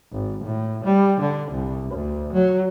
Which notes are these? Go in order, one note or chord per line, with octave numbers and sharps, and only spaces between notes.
G#1
A2
G3
D3
C2
D2
F#3